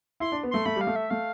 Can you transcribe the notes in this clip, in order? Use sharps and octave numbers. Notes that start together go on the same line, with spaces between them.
E4 C6
D4
B3
A3 C6
A3 B5
G3
F5
A3
E5
A3 F5